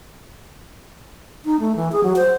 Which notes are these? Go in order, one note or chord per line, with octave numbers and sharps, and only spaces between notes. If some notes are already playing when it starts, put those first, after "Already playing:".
D#4
A3
E3
G#4
F#3
C5